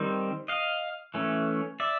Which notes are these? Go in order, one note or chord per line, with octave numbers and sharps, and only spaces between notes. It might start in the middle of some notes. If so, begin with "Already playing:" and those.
Already playing: D#3 G3 C4
D#5 F5
E3 A3 C#4
D5 E5